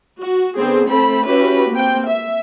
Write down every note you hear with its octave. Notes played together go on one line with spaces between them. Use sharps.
F#4
D3 B3 C4 G#4
A3 C4 A4 B5
C#4 E4 F#4 G4 B4
A#3 C4 G5
E5